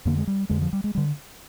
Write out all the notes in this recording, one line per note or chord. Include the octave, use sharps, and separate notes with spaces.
F2 D3 A#3
G#3
G3
F2 D3 G#3
F3
G3
G#3
G3
D3